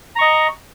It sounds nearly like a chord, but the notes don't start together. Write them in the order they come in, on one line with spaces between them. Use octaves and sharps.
A#5 C#6 D#5